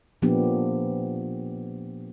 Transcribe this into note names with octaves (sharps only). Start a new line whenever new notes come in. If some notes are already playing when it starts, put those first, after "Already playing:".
A#2 F3 A#3 B3 D4 G4